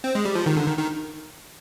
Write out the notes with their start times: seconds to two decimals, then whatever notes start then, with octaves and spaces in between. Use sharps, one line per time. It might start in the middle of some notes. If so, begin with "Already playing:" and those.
0.04 C4
0.15 G#3
0.25 G3
0.35 F3
0.46 D#3
0.57 D3
0.67 D#3
0.78 D#3